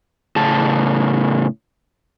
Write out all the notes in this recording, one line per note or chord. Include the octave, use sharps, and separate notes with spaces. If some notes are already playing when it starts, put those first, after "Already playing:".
A2 C#3 A5